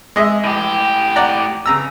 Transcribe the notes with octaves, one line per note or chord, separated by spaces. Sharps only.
G#3 D#5 E5
A2 G4
D5 F#5 A#5
C#3 A#5 E6